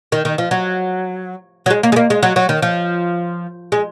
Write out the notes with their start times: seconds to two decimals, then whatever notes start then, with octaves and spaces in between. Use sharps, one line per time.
0.12 D#3
0.25 D#3
0.38 F3
0.51 F#3
1.66 F#3
1.70 G#3
1.83 A#3
1.92 G#3
1.96 A#3
2.10 G#3
2.23 F#3
2.36 F#3
2.49 D#3
2.62 F3
3.72 G#3